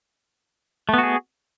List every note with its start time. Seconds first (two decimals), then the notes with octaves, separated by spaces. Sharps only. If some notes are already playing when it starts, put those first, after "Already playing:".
0.89 A3
0.94 B3
0.98 F#4
1.03 G#4